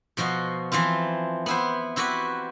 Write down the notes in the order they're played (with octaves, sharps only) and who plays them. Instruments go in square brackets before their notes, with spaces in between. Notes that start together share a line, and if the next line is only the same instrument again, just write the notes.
[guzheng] B2 F3 F#4 D#5
E3 F3 C4 F4
B3 E4 C5
C4 E4 F#4 G4 B4